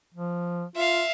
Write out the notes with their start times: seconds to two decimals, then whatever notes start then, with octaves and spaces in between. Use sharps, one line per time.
0.14 F3
0.76 F4 E5 F5